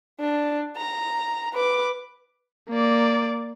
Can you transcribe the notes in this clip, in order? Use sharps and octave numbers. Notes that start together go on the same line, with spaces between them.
D4
A#5
B4 D6
A#3 D5